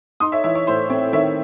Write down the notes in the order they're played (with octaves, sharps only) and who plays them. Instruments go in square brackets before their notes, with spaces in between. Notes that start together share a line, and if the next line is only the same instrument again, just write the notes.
[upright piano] D#4 C6 D#6
C#5 E5
E3 C#5 E5
C#5
A2 C5
C4 C#5
D#3 C#5 E5